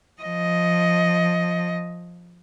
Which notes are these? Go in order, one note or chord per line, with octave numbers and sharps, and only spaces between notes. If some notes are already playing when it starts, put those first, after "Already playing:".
F3 D#5